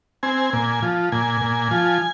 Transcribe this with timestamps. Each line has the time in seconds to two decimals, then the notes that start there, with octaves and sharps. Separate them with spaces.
0.23 C4 G#5
0.53 A#2
0.82 F3
1.12 A#2 G#5
1.41 A#2
1.71 F3